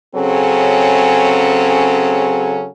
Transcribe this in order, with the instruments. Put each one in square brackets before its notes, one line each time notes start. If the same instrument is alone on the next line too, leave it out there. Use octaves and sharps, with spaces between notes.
[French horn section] C#3 F#3 C4 C#4 G#4 A4